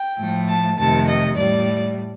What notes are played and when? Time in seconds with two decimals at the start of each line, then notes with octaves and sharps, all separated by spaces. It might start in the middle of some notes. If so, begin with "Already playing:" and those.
Already playing: G5
0.19 A2 F3 A3
0.48 A5
0.78 F2 C3 D#3 A3 A5
1.08 D#5
1.38 A2 G3 D5